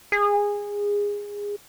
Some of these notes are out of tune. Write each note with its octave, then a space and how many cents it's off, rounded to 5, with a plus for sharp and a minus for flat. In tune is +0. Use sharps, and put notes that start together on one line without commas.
G#4 -20